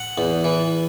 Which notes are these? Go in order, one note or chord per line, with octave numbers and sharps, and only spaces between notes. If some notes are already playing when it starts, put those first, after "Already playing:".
Already playing: F#5
E2
E3